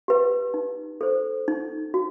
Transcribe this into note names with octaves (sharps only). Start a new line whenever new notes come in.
G4 B4
D#4
A4 C5
D#4
F#4